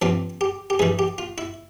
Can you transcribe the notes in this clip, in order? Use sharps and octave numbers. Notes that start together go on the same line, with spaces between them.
G2 F3 C4 F4
G4
G4
G2 E3 G3 G#4
G4
F4
E4